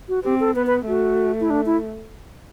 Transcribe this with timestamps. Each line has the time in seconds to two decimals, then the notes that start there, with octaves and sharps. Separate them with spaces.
0.09 F#4
0.24 C4 G4
0.40 A4
0.56 B3 B4
0.67 B4
0.87 A3 F#4
1.41 E4
1.50 D4
1.66 E4